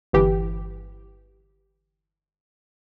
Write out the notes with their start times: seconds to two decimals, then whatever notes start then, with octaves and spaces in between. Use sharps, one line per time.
0.13 G1 E3 G4